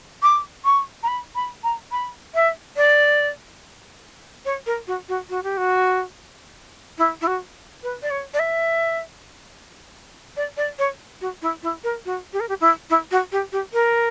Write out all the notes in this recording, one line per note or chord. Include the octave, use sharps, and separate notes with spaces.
D6
C#6
A#5
B5
B5
A#5
B5
E5
D5
C#5
A#4
F#4
F#4
F#4
G4
F#4
E4
E4
F#4
B4
D5
C#5
D5
E5
D5
D5
C#5
F#4
E4
E4
A#4
F#4
G4
A#4
G4
E4
E4
F#4
G4
G4
A#4